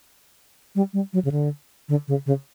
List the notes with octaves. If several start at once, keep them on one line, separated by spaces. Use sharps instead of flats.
G3
G3
F#3
C#3
D3
D3
C#3
C#3